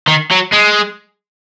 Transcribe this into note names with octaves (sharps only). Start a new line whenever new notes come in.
D#3
F#3
G#3